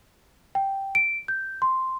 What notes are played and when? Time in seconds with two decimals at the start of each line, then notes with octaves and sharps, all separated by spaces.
0.55 G5
0.95 D7
1.28 G6
1.62 C6